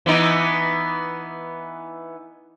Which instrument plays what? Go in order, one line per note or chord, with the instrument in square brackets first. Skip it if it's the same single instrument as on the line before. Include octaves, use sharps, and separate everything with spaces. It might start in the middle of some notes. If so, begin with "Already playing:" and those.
[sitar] E3 B3 D#4